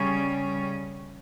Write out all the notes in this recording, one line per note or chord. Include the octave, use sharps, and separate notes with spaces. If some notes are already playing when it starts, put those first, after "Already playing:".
Already playing: C#3 G3 C#4